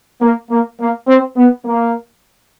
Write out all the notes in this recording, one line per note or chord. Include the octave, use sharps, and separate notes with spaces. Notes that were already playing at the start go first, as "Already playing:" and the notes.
A#3
A#3
A#3
C4
B3
A#3